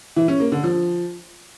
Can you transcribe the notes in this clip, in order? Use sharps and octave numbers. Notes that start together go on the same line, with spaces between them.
E3
C#4
A#3
D3
F3